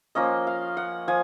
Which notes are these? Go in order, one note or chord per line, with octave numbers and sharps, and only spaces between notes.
F3 A#3 C#4 D#5
F5
F#5
F3 G#5